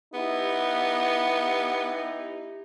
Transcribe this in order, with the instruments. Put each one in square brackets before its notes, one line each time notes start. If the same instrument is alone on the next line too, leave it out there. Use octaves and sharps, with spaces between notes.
[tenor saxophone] B3 [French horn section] D#4 E4 G4